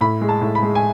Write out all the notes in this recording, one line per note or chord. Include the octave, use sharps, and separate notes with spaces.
A2 B5
G#3
A5
A2
B5
G#3
G#5